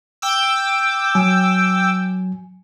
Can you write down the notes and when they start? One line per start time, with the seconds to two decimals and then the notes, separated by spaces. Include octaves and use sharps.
0.22 G5 D6 E6
1.15 F#3 G#5